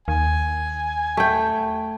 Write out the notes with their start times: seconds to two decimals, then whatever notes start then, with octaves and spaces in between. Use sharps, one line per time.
0.08 D#2 G#5
1.17 A3 G5